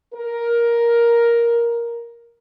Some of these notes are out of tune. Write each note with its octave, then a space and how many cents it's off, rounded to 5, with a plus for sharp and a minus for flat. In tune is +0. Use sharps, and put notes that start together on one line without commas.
A#4 +10